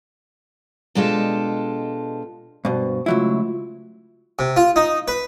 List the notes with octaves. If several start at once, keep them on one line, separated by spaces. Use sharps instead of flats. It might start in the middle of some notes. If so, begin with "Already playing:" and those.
B2 G#3 D4 F4 G4 A4
G2 B2 C5
C#2 F#3 A3 E4 F4 E5
C3
F4
D#4
B4